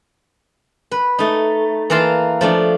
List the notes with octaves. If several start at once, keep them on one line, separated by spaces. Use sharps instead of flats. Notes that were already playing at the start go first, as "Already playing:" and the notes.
B4
A3 D#4
E3 A#3 A#4 A5 C6
F3 A3 D4